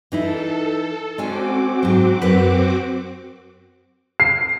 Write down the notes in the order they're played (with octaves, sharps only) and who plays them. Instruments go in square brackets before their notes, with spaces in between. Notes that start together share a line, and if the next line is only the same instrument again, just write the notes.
[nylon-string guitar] E3 D#4 E4 [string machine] A4
[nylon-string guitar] G#3 C#4 G#5 [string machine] C4 F#4 D6
[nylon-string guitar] G#2 F#3
F#2 F#3 B4
[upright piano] C7